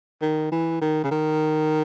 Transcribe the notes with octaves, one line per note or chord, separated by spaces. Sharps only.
D#3
E3
D#3
C#3
D#3